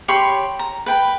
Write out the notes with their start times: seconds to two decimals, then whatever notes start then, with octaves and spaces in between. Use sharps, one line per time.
0.08 G4 C#5 B5 C6
0.59 A#5
0.86 B4 G5 B5